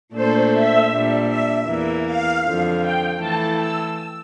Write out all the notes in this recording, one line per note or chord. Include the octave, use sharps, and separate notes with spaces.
A#2 A3 D4 A4 C5
E5
A#2 G3 D4
E5
E2 E3 A#3
F5
F2 D3 F3
G5
E3 A3 E4 A4 A5
E6